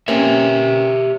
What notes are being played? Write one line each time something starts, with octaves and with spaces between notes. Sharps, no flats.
A#3 C4 C#4 G4 C#5 E5